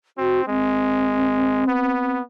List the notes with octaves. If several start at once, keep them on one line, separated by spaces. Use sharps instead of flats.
C4 F#4
G#3 C4
B3